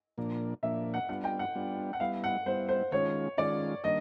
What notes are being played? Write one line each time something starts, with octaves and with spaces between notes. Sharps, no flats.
A#2 F3 A#3 D4
A#2 F3 A#3 D4 E5
F#5
G3 B3 D4 F4 F#5
G5
F#5
G3 B3 D4 F4
F#5
G3 B3 E4 F5
F#5
G3 B3 E4 C5
C5
D#3 G#3 C#4 F4 C#5
D#3 G#3 C#4 F4 D5
D#3 G3 A#3 D4 D#5